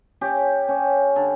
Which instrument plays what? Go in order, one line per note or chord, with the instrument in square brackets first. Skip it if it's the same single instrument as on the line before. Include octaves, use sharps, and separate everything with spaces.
[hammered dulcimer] C#4 G4
C#4
D3